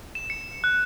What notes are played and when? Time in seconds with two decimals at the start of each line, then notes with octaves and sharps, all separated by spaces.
0.15 E7
0.30 C#7
0.64 F#6